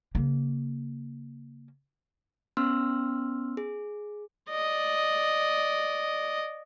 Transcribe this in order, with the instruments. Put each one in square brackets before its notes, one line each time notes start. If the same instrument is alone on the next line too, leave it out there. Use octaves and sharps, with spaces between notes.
[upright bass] C#3 A#3
[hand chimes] B3 C#4 C6 E6 F6
G#4
[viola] D5 D#5